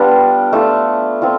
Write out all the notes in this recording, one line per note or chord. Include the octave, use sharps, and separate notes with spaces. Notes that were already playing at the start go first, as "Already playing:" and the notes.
Already playing: G3 B3 D4 F4
A3 D4 F4
C4 F4